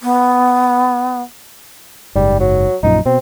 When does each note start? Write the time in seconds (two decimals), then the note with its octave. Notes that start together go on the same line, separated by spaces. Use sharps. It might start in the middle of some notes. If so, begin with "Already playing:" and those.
0.01 B3
2.15 F#1 G#2 G3
2.40 F#3
2.83 A#1 F#2 A#2 D#4
3.05 B2 C4